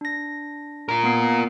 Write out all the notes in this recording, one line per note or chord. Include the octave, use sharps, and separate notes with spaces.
D4 A#6
F4 A#4
A#3 B3 C7